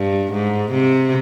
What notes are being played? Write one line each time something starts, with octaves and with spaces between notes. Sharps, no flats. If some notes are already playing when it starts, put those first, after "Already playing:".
Already playing: G2
G#2
C3